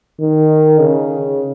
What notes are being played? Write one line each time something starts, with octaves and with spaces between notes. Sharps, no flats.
D#3
C#3